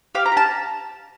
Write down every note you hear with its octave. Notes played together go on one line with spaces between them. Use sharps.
G4 F5
A#5
G4
A5